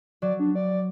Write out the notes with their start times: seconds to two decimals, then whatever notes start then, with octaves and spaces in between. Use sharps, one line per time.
0.22 F#3 D5
0.40 D4
0.55 D5